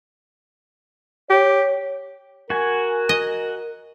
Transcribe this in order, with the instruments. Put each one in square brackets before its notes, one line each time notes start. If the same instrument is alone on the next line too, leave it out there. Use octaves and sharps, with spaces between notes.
[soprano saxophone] G4 [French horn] C#5
[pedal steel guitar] F#4 G#5 [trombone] A#4
[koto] D#5